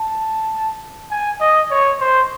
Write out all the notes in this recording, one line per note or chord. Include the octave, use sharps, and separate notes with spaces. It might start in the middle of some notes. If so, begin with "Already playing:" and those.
Already playing: A5
G#5
D#5
C#5
C5